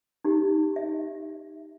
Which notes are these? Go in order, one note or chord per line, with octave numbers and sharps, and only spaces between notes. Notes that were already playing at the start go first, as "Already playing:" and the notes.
D#4 G4
E5